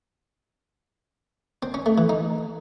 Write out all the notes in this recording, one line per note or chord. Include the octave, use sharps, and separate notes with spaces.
C4
C#4
A3
E3
D#4